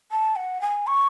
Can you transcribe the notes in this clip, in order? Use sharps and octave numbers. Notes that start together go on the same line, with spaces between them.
A5
F#5
G#5
C#6